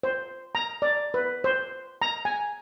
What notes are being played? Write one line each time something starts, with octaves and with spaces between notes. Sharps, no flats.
C5
A#5
D5
B4
C5
A#5
G#5